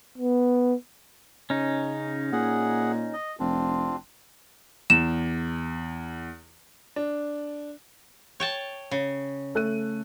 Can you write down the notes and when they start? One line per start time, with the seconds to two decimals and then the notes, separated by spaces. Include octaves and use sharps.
0.18 B3
1.50 C#3 C#4 D#4
2.32 A#2 G#4 F#5
3.13 D#5
3.40 F1 C4 D4 F4
4.90 E2 E7
6.96 D4
8.40 C#5 G5 A5
8.91 C#3
9.55 A3 F#6 D#7